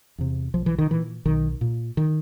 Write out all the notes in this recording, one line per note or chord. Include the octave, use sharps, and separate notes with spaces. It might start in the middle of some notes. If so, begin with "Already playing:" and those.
E2 C3
B1 F3
E3
D#3
A#2 E3
B1 D#3
A#2
D#3